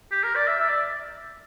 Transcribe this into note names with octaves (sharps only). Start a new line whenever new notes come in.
G4
A#4
D5
E5
E5
D5